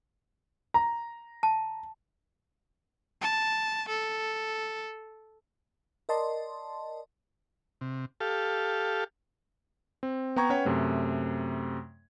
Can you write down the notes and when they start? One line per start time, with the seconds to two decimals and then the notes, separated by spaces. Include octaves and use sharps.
0.74 A#5
1.43 A5
3.22 A5
3.89 A4
6.09 A#4 D5 D#5 A5 C6
7.81 C3
8.20 G4 A4 F5
10.03 C4
10.36 B3 G5 A#5 C#6 G#6
10.50 C#4 B4 C#5 F#5 G5
10.65 F#2 C3 A3